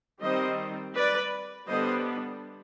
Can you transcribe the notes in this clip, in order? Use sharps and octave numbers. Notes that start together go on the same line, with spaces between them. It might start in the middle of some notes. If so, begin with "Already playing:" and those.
D#3 G3 C4 C5 D#5
B4 D5
D3 G3 B3 D4 C5 D#5